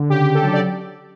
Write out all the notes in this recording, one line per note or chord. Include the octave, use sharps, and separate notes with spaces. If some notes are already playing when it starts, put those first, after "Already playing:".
Already playing: D3
C#3 G4
C#3
A4
F#3
D5